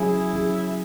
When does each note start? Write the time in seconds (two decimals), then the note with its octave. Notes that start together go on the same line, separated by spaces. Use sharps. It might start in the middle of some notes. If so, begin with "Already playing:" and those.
Already playing: F#3 C#4 E4 G#4
0.33 F#3 C#4 G#4